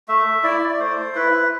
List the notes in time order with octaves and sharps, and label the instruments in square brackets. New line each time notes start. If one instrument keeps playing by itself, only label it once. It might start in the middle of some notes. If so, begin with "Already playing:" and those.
[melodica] A3 E5
E4 D5
D5
A3 C5
E4 B4